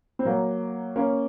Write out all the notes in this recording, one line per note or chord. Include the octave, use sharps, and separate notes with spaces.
C4
F#3 A#3
A#3 C#4